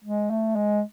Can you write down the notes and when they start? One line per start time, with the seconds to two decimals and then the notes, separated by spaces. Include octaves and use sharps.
0.04 G#3
0.30 A3
0.55 G#3